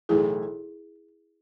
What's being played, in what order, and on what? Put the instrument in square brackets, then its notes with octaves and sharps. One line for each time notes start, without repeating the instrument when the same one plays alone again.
[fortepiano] B1 A2 E3 A3 [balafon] E4 G#4